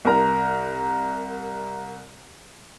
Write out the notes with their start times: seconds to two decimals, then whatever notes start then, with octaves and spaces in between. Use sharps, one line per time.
0.05 C2 A#4 A#5